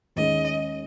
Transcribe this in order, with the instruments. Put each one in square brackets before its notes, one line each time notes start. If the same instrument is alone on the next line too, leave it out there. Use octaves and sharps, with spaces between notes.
[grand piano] D#2 D#3 G#3 C#4 G#4 [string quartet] D#5